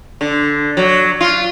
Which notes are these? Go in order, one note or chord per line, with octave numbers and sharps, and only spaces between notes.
D3
F#3
F4